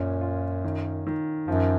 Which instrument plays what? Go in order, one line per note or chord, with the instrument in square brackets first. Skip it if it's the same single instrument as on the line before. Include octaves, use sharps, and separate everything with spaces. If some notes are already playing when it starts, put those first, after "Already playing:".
Already playing: [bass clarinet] F#2 [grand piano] A#2 C#4
[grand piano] F4
D#3
D#3
[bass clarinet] F#2 [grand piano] F3